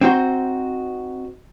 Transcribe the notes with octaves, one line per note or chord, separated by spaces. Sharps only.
C4 D#4 F#4 C5